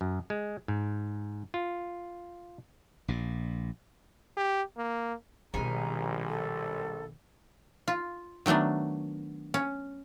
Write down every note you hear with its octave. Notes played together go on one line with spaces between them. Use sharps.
F#2
G#3
G#2
F4
A#1 A#2
G4
A#3
A#1 B2 D#3 G3 G#3 G#5 A#5
A4
F4
D#3 F#3 A3 B3 D4
C#4